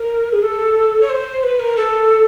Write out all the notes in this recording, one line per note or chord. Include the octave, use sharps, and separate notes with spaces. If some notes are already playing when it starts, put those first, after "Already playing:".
Already playing: A#4
G#4
A4
C#5
C5
B4
A#4
A4